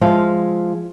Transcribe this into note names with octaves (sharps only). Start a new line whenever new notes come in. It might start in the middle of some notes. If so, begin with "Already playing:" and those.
F3 G#3 E5 F5